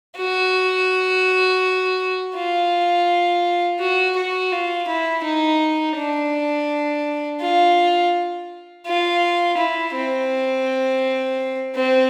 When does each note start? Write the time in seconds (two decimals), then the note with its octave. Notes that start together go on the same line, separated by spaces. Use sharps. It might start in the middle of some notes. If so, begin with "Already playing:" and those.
0.18 F#4
2.35 F4
3.80 F#4
4.16 F#4
4.52 F4
4.88 E4
5.24 D#4
5.97 D4
7.41 F4
8.86 F4
9.58 E4
9.95 C4
11.76 C4